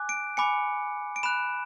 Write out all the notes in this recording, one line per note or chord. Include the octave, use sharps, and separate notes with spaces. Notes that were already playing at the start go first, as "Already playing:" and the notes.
Already playing: G#5 D6 F#6
D7
G#5 B5 D6 C#7
D7
B5 F#6 E7